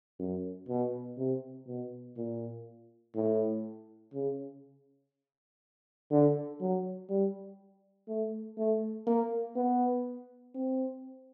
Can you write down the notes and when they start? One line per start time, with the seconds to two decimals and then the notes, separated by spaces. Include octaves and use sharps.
0.20 F#2
0.69 B2
1.18 C3
1.67 B2
2.17 A#2
3.15 A2
4.14 C#3
6.11 D3
6.61 F#3
7.10 G3
8.08 A3
8.58 A3
9.07 A#3
9.56 B3
10.55 C4